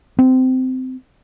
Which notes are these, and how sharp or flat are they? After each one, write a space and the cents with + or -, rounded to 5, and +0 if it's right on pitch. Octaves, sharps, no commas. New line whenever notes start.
C4 -20